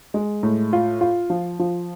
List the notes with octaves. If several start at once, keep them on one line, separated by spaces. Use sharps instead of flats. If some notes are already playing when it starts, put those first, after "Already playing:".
G#3
A2
F4
F4
F3
F3